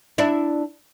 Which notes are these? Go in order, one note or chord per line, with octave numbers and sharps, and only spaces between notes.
D4 E4